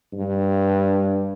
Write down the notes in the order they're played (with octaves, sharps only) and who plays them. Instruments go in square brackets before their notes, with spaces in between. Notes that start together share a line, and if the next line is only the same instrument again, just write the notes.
[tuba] G2